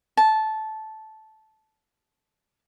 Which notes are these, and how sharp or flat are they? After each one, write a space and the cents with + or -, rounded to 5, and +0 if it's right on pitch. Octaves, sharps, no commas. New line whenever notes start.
A5 -15